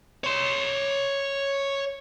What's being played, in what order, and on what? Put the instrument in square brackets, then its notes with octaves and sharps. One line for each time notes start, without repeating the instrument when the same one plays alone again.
[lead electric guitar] C#5 C6